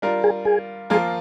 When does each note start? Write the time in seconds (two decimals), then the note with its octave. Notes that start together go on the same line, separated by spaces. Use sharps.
0.02 G3 D4 F4 A#4
0.24 G#4
0.45 G#4
0.90 F3 A#3 F4 G#4 A#4